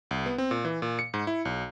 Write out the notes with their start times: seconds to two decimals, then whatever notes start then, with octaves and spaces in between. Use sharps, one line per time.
0.11 C2
0.26 B3
0.38 C4
0.51 A#2
0.65 E3
0.82 A#2
0.99 C#7
1.14 G#2
1.27 E4
1.45 B1